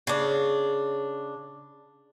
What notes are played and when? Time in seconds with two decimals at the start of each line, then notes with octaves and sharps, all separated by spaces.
0.07 C#3 D4